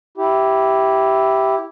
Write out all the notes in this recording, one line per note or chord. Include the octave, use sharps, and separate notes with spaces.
E4 G4